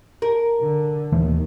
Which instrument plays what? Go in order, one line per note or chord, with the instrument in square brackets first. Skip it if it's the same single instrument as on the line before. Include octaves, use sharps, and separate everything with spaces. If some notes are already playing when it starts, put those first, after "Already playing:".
[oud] A#4
[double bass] D3
[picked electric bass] D#1 E3 A3 [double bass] D#2 D#3